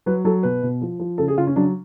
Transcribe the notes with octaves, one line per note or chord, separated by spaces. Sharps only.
F#3 B4
F#3 A4
B2 B4
B2
F3
F3
C#3 A4
G#4
C#3 F4
C#4
F#3 D4